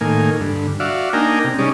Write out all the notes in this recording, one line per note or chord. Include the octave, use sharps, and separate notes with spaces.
A2 D#3 A#3 G#5
G2 D3
F#4 D5 E5 F5
A#3 D4 D#4 G5 G#5 A#5
C3
G3 C#4 D#4 G#4 D5